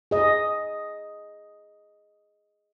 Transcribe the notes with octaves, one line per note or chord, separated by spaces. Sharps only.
G#4 D#5